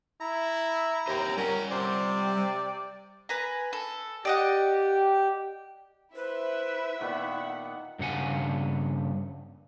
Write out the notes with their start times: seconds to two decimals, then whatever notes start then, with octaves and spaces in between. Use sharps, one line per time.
0.21 E4 A#5
1.08 D#2 C5 C#5 G5
1.38 G3 C#4 A#4 F#5
1.71 C3 C5 D5
3.29 B4 G#5 A#5
3.73 A4
4.25 G4 D5 D#5 F#5
6.16 E4 B4 C5 E5
7.00 A#2 D#3 B3 F#5
7.99 G2 C#3 F#5 G#5